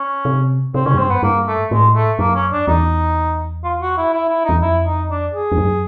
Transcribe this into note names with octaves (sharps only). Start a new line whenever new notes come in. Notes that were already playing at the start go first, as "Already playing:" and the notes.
Already playing: C#4
C3
C3 C4
C#3 C#4
F#2
G2 C4
F#2 B3
G2 A#3
A3
A2 G#3
A3
F#2 A#3
C#4
D4
E2 D#4
F4
F#4
E4
E4
E4
E2 D#4
F2 E4
D#4
D4
G#4
F2
F#2